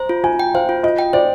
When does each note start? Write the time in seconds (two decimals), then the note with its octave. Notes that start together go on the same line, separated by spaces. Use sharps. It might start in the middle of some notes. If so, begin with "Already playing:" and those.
Already playing: C5 A#5
0.09 F4
0.24 F4 G#5
0.39 G5
0.54 C5 F5
0.69 F4
0.83 F4 D#5
0.99 G5
1.13 C5 D5